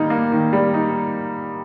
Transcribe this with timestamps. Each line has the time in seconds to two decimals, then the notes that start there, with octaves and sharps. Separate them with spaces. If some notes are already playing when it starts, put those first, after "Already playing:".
Already playing: D#3 G3 A#3 D#4
0.10 A#3
0.32 D#3
0.53 G3
0.74 D#4